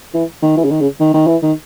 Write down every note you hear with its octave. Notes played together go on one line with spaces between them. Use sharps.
E3
D#3
E3
C#3
D#3
C#3
D#3
D#3
E3
D#3